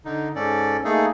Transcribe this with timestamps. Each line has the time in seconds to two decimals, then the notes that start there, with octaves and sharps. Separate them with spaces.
0.05 D3 D#4
0.35 G#2 C#4 A4 D5
0.84 A3 A#3 D#4 G#4 A4